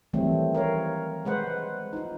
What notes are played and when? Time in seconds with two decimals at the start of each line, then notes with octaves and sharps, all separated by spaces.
0.13 D#3 E3 F#3 G3 A3 C4
0.55 A#4 C#5 F5
1.25 G#3 B4 C5 F#5
1.93 D#4 F4